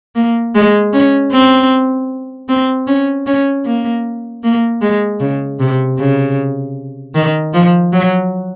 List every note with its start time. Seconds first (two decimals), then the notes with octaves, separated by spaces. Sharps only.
0.16 A#3
0.55 G#3
0.93 C#4
1.32 C4
2.49 C4
2.87 C#4
3.26 C#4
3.65 A#3
4.43 A#3
4.81 G#3
5.20 C#3
5.60 C3
5.98 C#3
7.15 D#3
7.53 F3
7.93 F#3